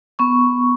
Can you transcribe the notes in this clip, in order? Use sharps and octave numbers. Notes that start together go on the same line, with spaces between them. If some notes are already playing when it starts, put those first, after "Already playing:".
B3 C#6